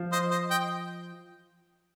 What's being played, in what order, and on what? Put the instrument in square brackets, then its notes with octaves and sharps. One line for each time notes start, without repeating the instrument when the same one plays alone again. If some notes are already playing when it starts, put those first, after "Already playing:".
Already playing: [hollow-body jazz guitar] F3
[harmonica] C5 D#5
C5 D#5
D#5 G5